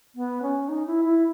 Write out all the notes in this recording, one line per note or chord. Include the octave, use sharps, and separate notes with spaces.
B3
C#4
D#4
E4
E4